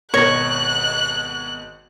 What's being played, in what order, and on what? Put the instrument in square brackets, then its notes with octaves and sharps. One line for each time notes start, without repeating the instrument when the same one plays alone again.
[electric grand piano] G#1 B2 A#6 [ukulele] C#5 [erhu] F#6